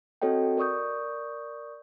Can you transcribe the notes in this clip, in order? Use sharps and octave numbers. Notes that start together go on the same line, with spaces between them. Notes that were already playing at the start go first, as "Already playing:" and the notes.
C4 F#4 A4 C#5 D#5 G5
A#4 D5 C#6 D#6 G6